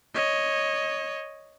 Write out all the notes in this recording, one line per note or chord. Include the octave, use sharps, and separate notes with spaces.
C#5 D#5